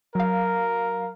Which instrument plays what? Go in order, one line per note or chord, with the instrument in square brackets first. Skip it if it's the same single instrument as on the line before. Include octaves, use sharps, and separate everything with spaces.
[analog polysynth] F#3 F5 [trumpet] A#4